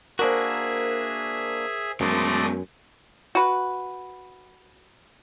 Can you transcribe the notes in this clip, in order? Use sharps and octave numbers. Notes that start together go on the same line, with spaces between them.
A#3 D4 F#4 G#4 A#4 C5 E5
F#2 G#3 A3 B3 D5 D#5
F#4 B4